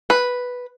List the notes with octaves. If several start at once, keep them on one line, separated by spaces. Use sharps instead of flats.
B4